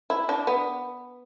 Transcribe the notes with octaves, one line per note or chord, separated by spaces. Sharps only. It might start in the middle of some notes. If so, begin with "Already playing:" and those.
E4
D4
B3